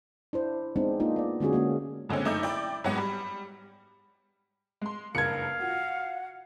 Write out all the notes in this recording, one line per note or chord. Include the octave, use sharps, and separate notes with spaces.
D4 E4 C5
G#3 B3 C4 D4 D#4
A#3 D4 D#4 F4
B3 D5
D3 G#3 C#4 F#4 G#4
G#3 A#3 C#4
A#2 D3 G#3 C4 C#4
F#1 A3 D#4 D6 E6 G6
E4 D5 G5 D6
G#2 F#3 G#3 B3 F#4
G3
G#3 C6
F#1 G2 A#4 F5 G#6 C#7
F4 F#4 F#5